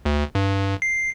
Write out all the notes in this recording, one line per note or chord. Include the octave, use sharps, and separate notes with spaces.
D2
G2
C7